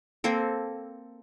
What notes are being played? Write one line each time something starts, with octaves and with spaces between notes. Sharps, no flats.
A#3 C4 A4